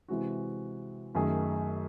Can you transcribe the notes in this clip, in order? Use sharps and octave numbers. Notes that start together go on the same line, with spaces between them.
C3 E3 G#3 C4 F#4
F#2 D#3 A3 D#4 G#4